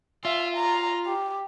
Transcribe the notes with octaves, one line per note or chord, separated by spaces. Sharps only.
F4 E5
A#5
G4